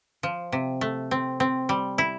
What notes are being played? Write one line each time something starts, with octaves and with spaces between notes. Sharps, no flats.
F3
C3
A3
C4
C4
G3
E4